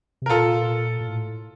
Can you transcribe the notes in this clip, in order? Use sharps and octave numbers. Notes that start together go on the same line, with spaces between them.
C3
A#4
A#2 F4 A4
A#2
A2